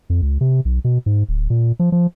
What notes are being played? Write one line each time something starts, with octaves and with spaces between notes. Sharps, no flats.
F2
C#2
C3
B1
B2
G#2
D1
A#2
F3
F3